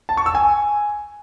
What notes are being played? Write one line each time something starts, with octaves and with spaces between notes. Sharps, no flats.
A5
C#6
E6
G#5